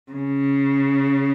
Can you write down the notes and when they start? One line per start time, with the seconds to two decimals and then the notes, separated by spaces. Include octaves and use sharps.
0.12 C#3